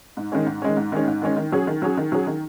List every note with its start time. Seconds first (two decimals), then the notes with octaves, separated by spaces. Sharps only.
0.17 G#2
0.32 D#3 G#3 C#4
0.46 G#2
0.62 D#3 G#3 C#4
0.77 G#2
0.92 D#3 G#3 C#4
1.07 G#2
1.22 D#3 G#3 C#4
1.37 D#3
1.52 F#3 C#4 G#4
1.67 D#3
1.82 F#3 C#4 G#4
1.97 D#3
2.12 F#3 C#4 G#4
2.27 D#3